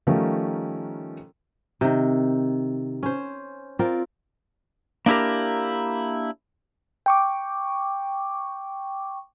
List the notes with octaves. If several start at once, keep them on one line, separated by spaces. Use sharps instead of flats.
D#3 F3 G3 A3 C#4 A#4
C3 D#3
C#4 C5
C4 F4 A#4 D5
A#3 D4 E4 G4 A#4
G5 C#6 D6